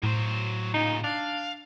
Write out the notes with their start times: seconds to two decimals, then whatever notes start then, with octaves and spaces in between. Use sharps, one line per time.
0.03 A2 F#3 C5
0.74 A#2 C#3 D#4
1.04 D4 F5